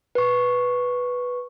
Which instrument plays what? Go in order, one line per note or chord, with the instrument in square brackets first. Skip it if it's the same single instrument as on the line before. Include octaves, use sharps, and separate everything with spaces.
[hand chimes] B4 C#6